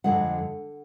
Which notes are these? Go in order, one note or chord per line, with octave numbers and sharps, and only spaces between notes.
F2 D3 G#3 F#5